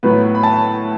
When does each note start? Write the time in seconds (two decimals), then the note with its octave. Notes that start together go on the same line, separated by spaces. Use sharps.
0.03 A2 F#3 B3 B4
0.35 B5
0.43 A5